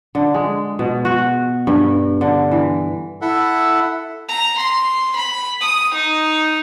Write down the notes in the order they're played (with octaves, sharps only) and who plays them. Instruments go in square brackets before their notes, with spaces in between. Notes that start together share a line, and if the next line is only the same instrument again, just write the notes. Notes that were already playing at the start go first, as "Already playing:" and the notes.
[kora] D3
G#3
B2
F#4
G2
D3
E3
[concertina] E4 A4 E5 F#5
[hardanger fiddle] A#5
C6
B5
D#6
D#4